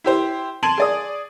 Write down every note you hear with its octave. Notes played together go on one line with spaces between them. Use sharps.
E4 G4 C5
A5 C6 G#6 D7 D#7 F#7
G#4 D5 D#6